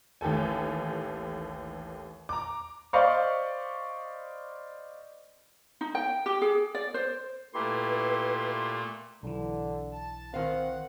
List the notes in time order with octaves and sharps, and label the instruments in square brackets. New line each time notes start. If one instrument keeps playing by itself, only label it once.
[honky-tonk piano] A1 D#2 G4 A4 G#5
A#5 D6
[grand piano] C5 D5 D#5 F5 B5 C#6
[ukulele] D#4
G5
G4
G#4
D5
C5
[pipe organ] A#2 A3 [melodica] E4 G4 [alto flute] B4 [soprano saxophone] C6
[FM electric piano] B1 E3 [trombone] D3
[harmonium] A5
[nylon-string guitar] D#3 F5 [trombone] C4 [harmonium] F#5